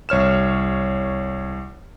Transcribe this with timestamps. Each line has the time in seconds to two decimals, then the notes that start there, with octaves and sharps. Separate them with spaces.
0.09 C2 C#5 F6 E7